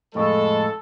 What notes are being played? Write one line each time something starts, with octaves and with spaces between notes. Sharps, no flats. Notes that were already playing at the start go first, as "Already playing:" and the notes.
F2 A2 G#3 A4